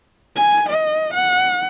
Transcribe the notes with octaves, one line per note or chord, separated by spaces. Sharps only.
G#5
D#5
F#5